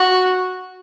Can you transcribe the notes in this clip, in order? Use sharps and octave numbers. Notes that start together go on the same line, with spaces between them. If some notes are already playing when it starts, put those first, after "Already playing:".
Already playing: F#4